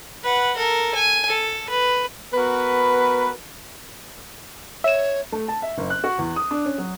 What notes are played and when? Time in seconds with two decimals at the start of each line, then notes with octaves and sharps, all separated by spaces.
0.23 B4 F#5
0.57 A4 A#4
0.95 G#5
1.28 A4
1.69 B4
2.33 B3 F#4 A#4 B4
4.84 C#5 E5 E7
5.32 A3
5.48 A5
5.62 E5
5.78 F#1
5.90 F#6
6.04 F#4
6.19 E2
6.36 D#6
6.51 D4
6.65 C#4
6.78 F#3